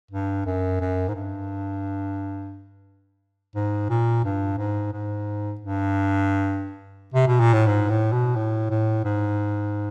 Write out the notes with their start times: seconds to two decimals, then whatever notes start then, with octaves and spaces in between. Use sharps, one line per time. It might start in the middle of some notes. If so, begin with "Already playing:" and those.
0.12 G2
0.46 F#2
0.81 F#2
1.08 G#2
1.15 G2
3.55 G#2
3.90 A#2
4.24 G2
4.58 G#2
4.93 G#2
5.61 G2
7.14 C3
7.28 B2
7.40 A#2
7.53 A2
7.67 G#2
7.89 A2
8.13 B2
8.36 A2
8.70 A2
9.05 G#2